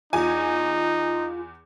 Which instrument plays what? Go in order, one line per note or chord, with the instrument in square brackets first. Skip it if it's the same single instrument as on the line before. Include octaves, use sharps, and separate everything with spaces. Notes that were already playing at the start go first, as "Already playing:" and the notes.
[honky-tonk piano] E2 G#5 [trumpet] D#4 [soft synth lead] F4